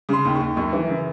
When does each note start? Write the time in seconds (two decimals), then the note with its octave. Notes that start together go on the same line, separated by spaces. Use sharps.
0.09 C#3 C6
0.25 D#2
0.35 C#6
0.41 D#2
0.57 F#2 C#6
0.73 E3
0.89 C#3